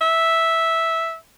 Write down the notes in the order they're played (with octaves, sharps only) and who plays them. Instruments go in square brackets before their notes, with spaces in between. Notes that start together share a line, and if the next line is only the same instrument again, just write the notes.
[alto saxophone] E5